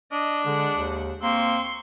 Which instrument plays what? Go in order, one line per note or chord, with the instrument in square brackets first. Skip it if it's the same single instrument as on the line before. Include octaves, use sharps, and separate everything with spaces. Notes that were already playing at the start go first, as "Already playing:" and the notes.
[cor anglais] D4 [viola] D#5
[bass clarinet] D3 [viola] G#3 F#5
[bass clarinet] D#2
[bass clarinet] A#3 [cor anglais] C4 [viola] C6 C#6